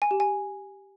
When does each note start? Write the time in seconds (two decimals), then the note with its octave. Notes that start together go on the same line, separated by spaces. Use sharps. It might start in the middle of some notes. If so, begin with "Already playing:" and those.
0.02 G#5
0.11 G4
0.20 G#5